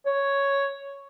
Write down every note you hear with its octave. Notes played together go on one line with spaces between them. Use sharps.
C#5